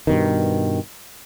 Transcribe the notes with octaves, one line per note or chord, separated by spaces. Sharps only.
G2 B2 D#3